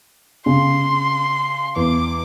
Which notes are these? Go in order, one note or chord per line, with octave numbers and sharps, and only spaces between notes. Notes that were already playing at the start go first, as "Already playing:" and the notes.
C#3 C6
E2 D6